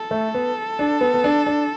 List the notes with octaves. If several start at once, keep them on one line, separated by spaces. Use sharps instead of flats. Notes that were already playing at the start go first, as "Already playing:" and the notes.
Already playing: A4
A3
B3
D4
B3
B3
D4
D4